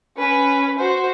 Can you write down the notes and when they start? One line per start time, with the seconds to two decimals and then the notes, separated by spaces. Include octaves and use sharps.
0.17 C#4 B4
0.78 F#4 C5